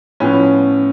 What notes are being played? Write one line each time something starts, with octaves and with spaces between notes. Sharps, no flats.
A2 F3 B3 C#4